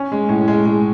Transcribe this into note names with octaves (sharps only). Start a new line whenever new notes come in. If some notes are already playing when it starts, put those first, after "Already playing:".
Already playing: C#4
G#3
A2
G#3
G#3